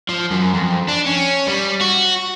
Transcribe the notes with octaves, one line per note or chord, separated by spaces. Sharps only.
F3
F#2
F2
D4
C#4
G3
F#4